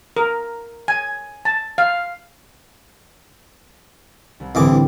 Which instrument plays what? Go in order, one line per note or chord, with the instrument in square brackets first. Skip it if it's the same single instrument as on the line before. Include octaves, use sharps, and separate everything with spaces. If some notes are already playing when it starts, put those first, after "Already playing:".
[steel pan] A#4
G#5
A5
F5
[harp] C2
[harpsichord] C2 E3 D6 [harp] A2 D3 C4